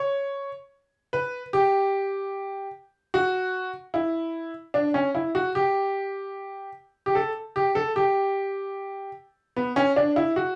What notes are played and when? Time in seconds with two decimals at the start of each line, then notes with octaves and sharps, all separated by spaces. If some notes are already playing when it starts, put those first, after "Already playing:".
Already playing: C#5
1.13 B4
1.53 G4
3.14 F#4
3.94 E4
4.74 D4
4.94 C#4
5.15 E4
5.35 F#4
5.55 G4
7.06 G4
7.15 A4
7.56 G4
7.75 A4
7.96 G4
9.56 B3
9.76 C#4
9.96 D4
10.16 E4
10.36 F#4